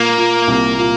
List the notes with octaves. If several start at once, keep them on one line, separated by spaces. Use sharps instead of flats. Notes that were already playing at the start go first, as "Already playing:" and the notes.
Already playing: A#2 A#3
A#2
C2
A#2